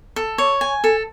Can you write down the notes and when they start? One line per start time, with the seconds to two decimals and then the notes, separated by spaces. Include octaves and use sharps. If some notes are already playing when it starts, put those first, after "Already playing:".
0.16 A4
0.38 C#5
0.61 G#5
0.84 A4